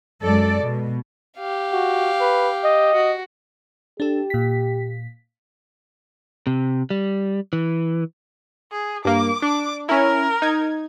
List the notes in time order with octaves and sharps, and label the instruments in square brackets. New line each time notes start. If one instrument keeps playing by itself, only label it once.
[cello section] F#2 G#3 A4 D5
B2
[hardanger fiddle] G4 F5
[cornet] F#4
B4
D#5
[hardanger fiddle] F#4
[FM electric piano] D4 A4 [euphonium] G4
[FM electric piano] A#2 B6
[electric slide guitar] C3
G3
E3
[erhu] G#4
[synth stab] G2 A#3 [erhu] D6
[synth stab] D4 [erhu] D6
[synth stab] C#4 E4 [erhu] A#4
[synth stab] D#4 G#6